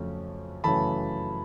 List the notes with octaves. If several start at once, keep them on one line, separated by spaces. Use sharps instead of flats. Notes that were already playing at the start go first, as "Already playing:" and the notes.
Already playing: F2 C#3 F#3 A3 C#4
F#2 C#3 E3 A3 A5 B5